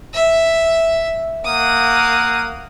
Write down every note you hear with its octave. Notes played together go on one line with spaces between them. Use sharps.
E5
A#3 F#5 D#6